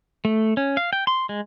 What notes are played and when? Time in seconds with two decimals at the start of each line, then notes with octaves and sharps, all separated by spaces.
0.25 A3
0.57 C#4
0.77 F5
0.93 G5
1.07 C6
1.29 G#3